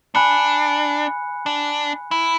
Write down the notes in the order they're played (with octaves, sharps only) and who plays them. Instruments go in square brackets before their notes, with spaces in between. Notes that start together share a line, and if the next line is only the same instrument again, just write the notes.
[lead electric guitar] D4 [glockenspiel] G#5 B5 F#6 C#7
[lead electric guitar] D4
E4